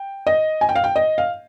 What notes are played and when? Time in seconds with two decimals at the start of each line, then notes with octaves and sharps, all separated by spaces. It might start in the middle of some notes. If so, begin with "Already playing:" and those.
Already playing: G5
0.27 D#5
0.61 G#5
0.69 G5
0.76 F5
0.84 G5
0.96 D#5
1.18 F5